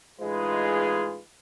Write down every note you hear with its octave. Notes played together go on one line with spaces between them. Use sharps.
A1 G#3 D#4 F4 G#4 B4